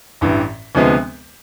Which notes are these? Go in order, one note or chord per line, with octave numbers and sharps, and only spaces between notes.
A1 G2 E3
D2 C3 F3 G#3 B3